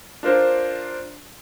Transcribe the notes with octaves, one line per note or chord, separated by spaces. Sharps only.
D4 F4 A#4 C5